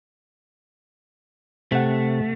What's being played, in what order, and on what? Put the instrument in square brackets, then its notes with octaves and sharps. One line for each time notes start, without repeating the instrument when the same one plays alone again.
[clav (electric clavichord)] C3 F#5 [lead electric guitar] A3